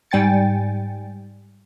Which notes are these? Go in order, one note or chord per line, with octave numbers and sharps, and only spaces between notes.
G#2 G3 G5 G#5 A6 C#7